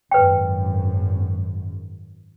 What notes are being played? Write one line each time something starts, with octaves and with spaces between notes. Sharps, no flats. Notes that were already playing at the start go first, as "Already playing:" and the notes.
G#1 F#2 B4 G5